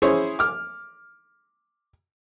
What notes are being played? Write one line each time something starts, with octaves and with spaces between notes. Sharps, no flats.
C#4 E4 G#4 C5 C#5
D6 F6